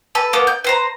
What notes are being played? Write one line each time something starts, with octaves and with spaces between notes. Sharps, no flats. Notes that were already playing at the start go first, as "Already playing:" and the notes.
A4 B4
A#3 B3
G6
B4 C5 A#5